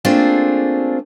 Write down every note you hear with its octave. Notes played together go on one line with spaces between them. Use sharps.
A3 A#3 C4 D4 F4 G#4